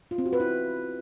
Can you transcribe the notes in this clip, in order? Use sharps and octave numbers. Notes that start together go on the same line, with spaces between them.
F4
C4
F#4
B4
E4